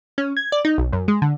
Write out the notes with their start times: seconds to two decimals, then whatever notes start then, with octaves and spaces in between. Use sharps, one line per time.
0.18 C#4
0.37 G#6
0.52 D5
0.65 D#4
0.78 B1
0.93 F#2
1.08 G#3
1.22 D3